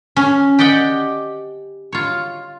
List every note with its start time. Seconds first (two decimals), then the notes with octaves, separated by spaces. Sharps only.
0.16 C#4
0.59 G4 D5 D#5 F#5 G5
1.92 F4 C#5